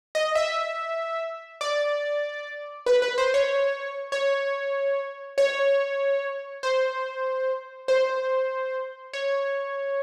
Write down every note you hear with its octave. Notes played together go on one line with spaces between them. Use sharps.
D#5
E5
D5
B4
B4
C5
C#5
C#5
C#5
C5
C5
C#5